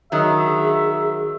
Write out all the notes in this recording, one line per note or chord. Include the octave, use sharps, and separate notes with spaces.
D#3 F#3 G#4 E5